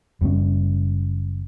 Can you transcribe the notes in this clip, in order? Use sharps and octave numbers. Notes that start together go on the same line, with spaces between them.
F#1 G3 C4 C#4